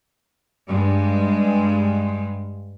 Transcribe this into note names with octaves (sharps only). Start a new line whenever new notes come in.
G2 G#3